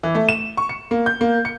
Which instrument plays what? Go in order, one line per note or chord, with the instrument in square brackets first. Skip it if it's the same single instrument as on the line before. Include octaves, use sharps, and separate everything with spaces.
[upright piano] E3
A3
E7
C#6
C#7
A#3
G6
A#3
C#7